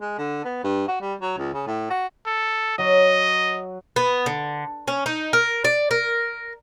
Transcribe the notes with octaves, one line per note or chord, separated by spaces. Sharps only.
G#3
D3
B3
G2
F#4
G3
F#3
C#2
C#3
A2
F#4
A4
F#3 D#5
B3
D3
C#4
D#4
A#4
D5
A#4